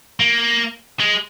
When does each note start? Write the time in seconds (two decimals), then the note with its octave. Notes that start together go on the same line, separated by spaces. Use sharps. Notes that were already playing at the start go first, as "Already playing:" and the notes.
0.20 A#3
1.00 G#3